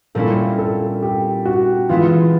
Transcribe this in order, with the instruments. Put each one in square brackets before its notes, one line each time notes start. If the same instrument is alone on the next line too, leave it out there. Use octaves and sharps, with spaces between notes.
[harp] A#2 G3 A#3 C#4 E4 [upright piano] A4
[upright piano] A4
G4
F#4
[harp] E3 G#3 B3 E4 [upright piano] F4